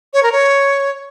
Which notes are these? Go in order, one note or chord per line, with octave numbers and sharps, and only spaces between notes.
C#5
A#4
C#5